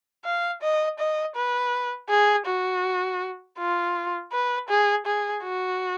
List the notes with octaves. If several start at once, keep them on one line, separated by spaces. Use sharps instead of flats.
F5
D#5
D#5
B4
G#4
F#4
F4
B4
G#4
G#4
F#4